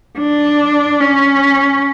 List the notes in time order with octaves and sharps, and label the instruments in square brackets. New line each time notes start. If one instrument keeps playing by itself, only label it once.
[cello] D4
C#4